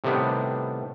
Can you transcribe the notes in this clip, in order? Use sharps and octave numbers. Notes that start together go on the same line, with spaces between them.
A2 C3 D#3 G3 B3 D4